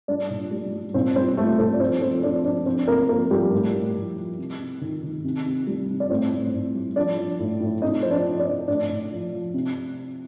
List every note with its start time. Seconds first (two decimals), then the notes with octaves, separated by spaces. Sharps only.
0.08 G3 D4 D5
0.30 A#2
0.51 G3
0.72 G3
0.94 A#2 C4 C5
1.16 G3 C4 C5
1.37 G3 A3 A4
1.59 A#2 A3 A4
1.73 D5
1.80 F3 C4 C5
2.01 F3 C4 C5
2.23 F3 D4 D5
2.44 F3 D4 D5
2.66 F3 C4 C5
2.88 C3 A#3 A#4
3.09 F3 A#3 A#4
3.31 F3 G3 G4
3.52 A2
3.74 A2
3.95 F3
4.17 F3
4.39 C3
4.60 C3
4.81 D#3
5.03 D#3
5.24 C3
5.46 C3
5.67 G3
5.88 C3
6.00 D5
6.10 A2 C4 C5
6.32 A2
6.53 A2
6.75 G3
6.96 F3 D4 D5
7.18 F3
7.39 A2
7.60 A2
7.82 C3 D#4 D#5
8.03 F3 C5
8.11 D4 D5
8.25 F3
8.39 D4 D5
8.46 C3
8.68 A2 D4 D5
8.90 A2
9.11 F3
9.33 F3
9.54 C3